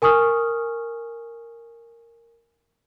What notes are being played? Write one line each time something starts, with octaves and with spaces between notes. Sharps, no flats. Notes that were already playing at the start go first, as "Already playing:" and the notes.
A#4 G#5 C#6 D#6 F6